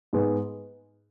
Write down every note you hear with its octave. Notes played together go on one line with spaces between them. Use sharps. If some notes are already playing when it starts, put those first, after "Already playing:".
G#2 G#3 B3